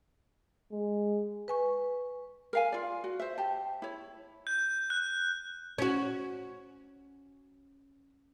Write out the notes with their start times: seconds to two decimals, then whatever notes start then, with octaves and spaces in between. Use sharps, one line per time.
0.72 G#3
1.48 B4 G#5 C#6
2.53 A#4 F5 G#5
2.72 F4 D5
3.04 F#4
3.20 C5 E5
3.38 G4 A5
3.82 E4 C#5
4.47 G6
4.90 F#6
5.78 C#4 F#4